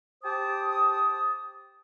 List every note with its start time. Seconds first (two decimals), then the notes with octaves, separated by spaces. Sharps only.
0.24 G4 C5 A5 D6 D#6